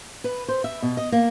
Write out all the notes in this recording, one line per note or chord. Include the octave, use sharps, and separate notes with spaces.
B4
C5
E5
B2
D#5
A#3